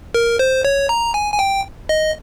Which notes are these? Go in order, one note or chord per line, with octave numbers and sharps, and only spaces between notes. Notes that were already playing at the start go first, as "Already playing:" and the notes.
A#4
C5
C#5
A#5
G#5
G#5
G5
D#5